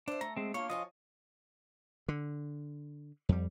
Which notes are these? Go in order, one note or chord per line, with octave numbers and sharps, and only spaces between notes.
D4 C5 E5
A3 A#5
G#3 C4
A#3 D4 F4 C#5
F3 F4 C#5 D#5 G#5
D3
F2 G3